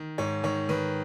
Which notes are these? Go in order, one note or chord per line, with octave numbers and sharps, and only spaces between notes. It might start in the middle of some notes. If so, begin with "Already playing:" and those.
Already playing: D#3
G#2 C#5
D#3 C#5
D#3 B4